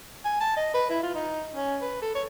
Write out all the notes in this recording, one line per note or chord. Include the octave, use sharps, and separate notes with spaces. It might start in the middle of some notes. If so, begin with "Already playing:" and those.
G#5
A5
D#5
B4
E4
F4
D#4
C#4
B4
A4
C#5